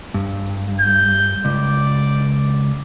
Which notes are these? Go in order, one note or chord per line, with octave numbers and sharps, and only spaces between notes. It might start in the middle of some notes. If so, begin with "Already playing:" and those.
G2
G6
C#2 D5